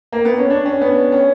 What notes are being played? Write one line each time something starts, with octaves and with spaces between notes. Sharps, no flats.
A#3
B3
C#4
D4
C#4
B3
C#4